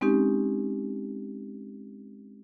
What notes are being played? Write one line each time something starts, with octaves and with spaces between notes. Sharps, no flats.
G#3 C4 C#4 D#4 G4